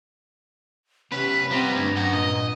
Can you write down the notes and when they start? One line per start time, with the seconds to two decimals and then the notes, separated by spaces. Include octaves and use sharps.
1.12 C3 B3 C#4 B4 B6
1.51 F3 G3 B3 C4 A#5
1.75 D2 G2
1.97 F#2 F#5
2.13 A#2 D#5